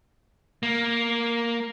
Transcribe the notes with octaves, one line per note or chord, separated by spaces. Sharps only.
A#3